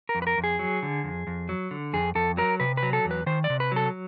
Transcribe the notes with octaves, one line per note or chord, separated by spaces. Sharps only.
A#4
F2
B4
A#4
F2
G#4
F#3
D3
F2
F2
F#3
D3
F2 G#4
F2 A4
F#3 A#4
C3 B4
B4
F#3
A4
E2
B4
D#3 C5
D5
C3
B4
F#3 A4